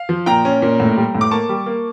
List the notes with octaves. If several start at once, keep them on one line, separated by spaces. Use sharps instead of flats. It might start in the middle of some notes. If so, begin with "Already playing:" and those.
Already playing: F5
F3
A#2 G5 A#5
C#4
A#2
A2
G3
A2
D6
A#3 A5 C#6
G3
A#3